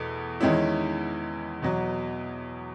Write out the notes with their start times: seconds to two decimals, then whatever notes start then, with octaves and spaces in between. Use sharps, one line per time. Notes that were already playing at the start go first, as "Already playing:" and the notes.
Already playing: E2 B2 A3
0.41 E2 D#3 G#3 C#4 E4
1.62 E2 B2 F#3